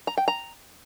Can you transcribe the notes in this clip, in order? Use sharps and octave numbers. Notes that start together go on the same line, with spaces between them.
A#5
G5
A#5